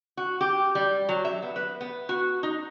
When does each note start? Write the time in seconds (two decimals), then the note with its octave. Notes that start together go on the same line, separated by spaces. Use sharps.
0.17 F#4
0.41 G4
0.75 G3
1.09 F#3
1.25 E5
1.42 B3
1.56 B4
1.81 B3
2.09 F#4
2.43 D#4